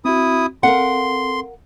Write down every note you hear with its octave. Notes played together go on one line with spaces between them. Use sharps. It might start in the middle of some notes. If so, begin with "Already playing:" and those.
C4 E4 F#4 D#6
C4 A4 A#4 F5 F#5 C6